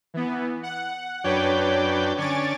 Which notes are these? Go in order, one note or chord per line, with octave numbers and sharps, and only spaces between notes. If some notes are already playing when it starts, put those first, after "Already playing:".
E3 B3
F#5
F#2 D4 B4 C#5 G5
D3 C#4 G#5 D6 A6